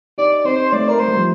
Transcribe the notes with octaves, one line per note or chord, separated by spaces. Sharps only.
D#4 G4 D5
C4 D#4 C5
A3 D5
A#4
A3 C5
G3
F3